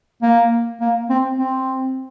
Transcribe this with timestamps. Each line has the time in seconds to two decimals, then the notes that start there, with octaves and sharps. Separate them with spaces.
0.22 A#3
0.81 A#3
1.10 C4
1.39 C4